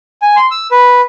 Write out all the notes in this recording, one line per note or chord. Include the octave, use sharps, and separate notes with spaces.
G#5
C6
E6
B4